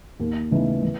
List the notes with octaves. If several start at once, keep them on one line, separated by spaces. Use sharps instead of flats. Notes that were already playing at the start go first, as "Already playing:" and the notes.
D#2
C#3 E3 A3 D#4
E3